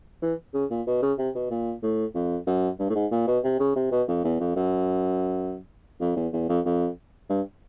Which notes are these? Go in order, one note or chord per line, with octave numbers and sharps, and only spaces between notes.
E3
C#3
A#2
B2
C#3
C3
B2
A#2
A2
F2
F#2
G2
A2
G#2
A#2
B2
C3
C#3
C3
B2
F2
E2
F2
F#2
F2
E2
E2
F2
F2
G2